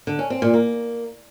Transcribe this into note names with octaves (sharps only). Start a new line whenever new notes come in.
D3
C#4
C4
A#2
A#3